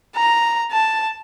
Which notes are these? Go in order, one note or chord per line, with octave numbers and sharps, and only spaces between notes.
A#5
A5